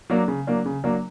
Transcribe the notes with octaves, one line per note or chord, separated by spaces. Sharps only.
F#3 A#3 D4
C#3
F#3 A#3 D4
C#3
F#3 A#3 D4